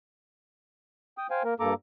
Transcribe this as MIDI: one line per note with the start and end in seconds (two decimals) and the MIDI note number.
1.18 1.27 79
1.18 1.27 87
1.31 1.43 72
1.31 1.43 77
1.31 1.43 79
1.31 1.43 80
1.44 1.54 58
1.44 1.54 70
1.60 1.74 43
1.60 1.74 58
1.60 1.74 69
1.60 1.74 82
1.60 1.74 86